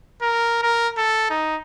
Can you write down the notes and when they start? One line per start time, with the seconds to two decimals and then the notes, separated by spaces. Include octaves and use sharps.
0.22 A#4
0.62 A#4
0.98 A4
1.30 D#4